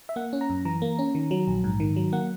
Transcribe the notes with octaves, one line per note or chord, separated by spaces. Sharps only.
E5
A#3 F#5
C#4
A#5
F#2
E3 A#5
A#3
C#4
D#3
F#3
A#1
G#2
D#3
F#3
A#3 F#5